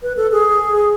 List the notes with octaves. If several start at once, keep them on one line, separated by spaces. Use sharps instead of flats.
B4
A4
G#4